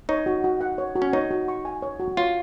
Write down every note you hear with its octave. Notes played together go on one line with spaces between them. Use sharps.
D#4 C#5
F#4
F#4
F#5
C#5
F#4
C#4
D#4 C#5
F#4
C#6
G#5
C#5
F#4
F4 C#5